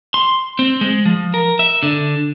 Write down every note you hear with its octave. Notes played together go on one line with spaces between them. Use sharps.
C6
C4
G#3
F3
A#4
E5
D3